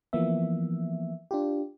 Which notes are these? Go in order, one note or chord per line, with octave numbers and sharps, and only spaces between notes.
E3 F3 A#3 B3 E5
D4 F4 G4